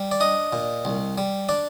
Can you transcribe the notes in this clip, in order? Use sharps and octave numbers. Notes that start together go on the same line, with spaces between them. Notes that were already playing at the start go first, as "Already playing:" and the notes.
Already playing: G3
D5
D4 D#5
A#2
C2
G3
D4 D5